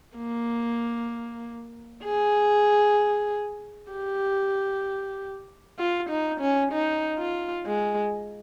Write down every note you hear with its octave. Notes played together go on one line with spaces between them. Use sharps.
A#3
G#4
G4
F4
D#4
C#4
D#4
F4
G#3